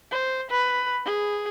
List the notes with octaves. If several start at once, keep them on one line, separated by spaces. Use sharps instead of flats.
C5
B4
G#4